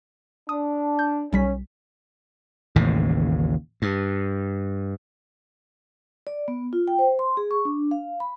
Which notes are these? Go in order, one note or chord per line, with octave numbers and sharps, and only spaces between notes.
D4 D#6
G6
B1 G3 C#4 B6
A1 D#2 A2 C#3
G2
D5
B3
F4
G5
C5
C6
G#4
C#6
D4
F5
B5